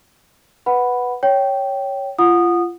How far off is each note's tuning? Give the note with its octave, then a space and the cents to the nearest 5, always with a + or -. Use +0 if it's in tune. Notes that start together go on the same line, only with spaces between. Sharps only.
B4 +0 F#5 +0 B5 +0
C#5 +0 G5 -10
F4 -25 F#5 -20 D#6 -15